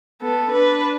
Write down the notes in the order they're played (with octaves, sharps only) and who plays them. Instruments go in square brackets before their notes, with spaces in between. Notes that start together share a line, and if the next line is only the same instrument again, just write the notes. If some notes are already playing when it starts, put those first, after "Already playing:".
[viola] B3 [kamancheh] A4
[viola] D4 [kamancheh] B4